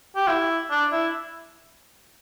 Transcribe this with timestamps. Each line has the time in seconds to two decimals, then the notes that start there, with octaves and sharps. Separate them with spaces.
0.16 G4
0.27 E4
0.70 D4
0.92 E4